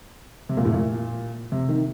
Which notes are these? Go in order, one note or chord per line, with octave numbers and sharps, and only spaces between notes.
C3
A#2
A2
A#2
C3
D#3